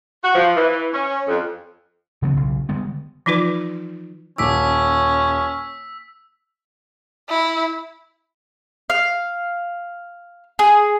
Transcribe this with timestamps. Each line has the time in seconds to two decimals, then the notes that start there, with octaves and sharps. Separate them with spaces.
0.23 F#4
0.35 F3
0.56 E3
0.93 C#4
1.28 F2
2.22 C#3 E3 F#3 B3
2.35 B1 C#3
2.69 D3 G3 G#3 B3
3.26 E3 F3 D#4 F4 B4
4.38 D#1 C#4 D6 E6 B6
7.29 E4
8.90 F5
10.59 G#4